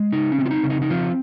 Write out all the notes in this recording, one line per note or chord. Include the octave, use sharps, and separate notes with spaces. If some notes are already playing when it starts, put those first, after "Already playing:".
Already playing: G#3
C#3 D#4
C#4
C4
F4
D#4
C#3
D#4
D#4
F3 C4 F4